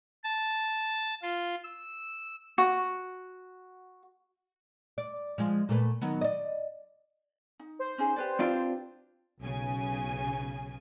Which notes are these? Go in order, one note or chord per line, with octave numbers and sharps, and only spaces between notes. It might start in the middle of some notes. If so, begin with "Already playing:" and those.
A5
F4
E6
F#4
D5
F3 G#3 F4
A#2 A3 B4
D#3 F#3 B3
D5 D#5
D#4
C5
C#4 D#4 G#4
G4 B4 D5
C4 D4 F4
B1 C#3 G#5